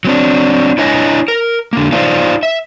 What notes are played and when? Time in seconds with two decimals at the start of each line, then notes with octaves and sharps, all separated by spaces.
0.05 F#3 C4 D4
0.78 D4 E4 C#5 D#5 G#5
1.28 A#4
1.73 D3 A#3
1.92 D#4 F4 C5 D5 F5
2.43 E5